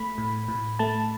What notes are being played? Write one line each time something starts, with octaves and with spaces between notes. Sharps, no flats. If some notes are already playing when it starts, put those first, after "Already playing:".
Already playing: A3 B5
A2
A2
A3 A5